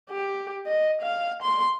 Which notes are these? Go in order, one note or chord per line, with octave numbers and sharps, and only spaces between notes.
G4
D#5
F5
C6